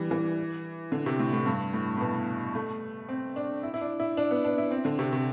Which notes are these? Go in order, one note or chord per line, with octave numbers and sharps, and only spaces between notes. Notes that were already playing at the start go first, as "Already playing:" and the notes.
Already playing: E3 G3 B3 D4
E3
D3
C3
A2
A2
G2
A2
A2
B2
A3
C4
D4
E4
E4
D4
E4
D4
B3
D4
E4
C4
D3
C3
C3